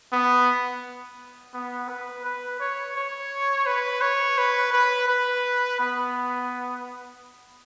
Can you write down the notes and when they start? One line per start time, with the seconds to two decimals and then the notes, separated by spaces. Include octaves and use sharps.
0.13 B3
1.54 B3
1.89 B4
2.24 B4
2.60 C#5
2.96 C#5
3.66 B4
4.01 C#5
4.38 B4
4.72 B4
5.08 B4
5.80 B3